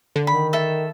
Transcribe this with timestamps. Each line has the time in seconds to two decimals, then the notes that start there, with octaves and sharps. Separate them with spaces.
0.16 D3
0.27 D#3 B5
0.53 A4 E5